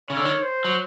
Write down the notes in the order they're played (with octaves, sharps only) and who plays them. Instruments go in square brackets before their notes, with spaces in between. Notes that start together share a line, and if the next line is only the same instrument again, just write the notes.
[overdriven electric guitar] C#3 [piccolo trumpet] C#5
[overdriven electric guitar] D3
D#3
[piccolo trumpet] C5
[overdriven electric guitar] F#3